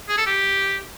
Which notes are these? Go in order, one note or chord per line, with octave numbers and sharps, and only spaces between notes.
G#4
A4
G4